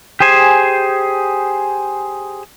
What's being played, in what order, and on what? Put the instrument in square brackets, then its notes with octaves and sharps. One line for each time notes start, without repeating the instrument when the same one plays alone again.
[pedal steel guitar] G4 G#4 C5 G#5